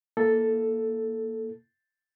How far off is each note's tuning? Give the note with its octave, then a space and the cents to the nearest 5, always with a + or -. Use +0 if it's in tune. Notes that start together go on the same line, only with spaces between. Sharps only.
A#3 +0 E4 -10 A4 +0